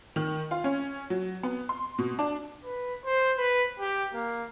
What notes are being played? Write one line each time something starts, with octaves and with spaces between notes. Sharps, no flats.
D#3
F4
C#4
F#3
B3
C6
B2
D4
B4
C5
B4
G4
A#3